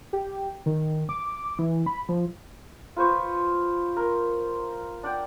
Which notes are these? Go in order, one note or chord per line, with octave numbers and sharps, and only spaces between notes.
G4
D#3
D6
E3
B5
F3
F4 B4 C5 C#6
A#4
D4 F#5 G5